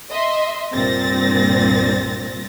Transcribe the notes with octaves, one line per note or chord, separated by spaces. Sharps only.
D#5 E5 C6
C2 G2 A#2 C4 A6 A#6